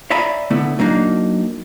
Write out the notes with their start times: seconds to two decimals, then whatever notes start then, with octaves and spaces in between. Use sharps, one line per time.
0.10 C#5 D5 E5 G#5 A#5 B5
0.50 D3 A3 B3 E4
0.79 F#3 A#3 D4 D#4